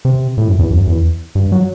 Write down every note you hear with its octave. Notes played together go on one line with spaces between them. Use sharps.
C3
A2
F#2
E2
F#2
E2
G2
F#3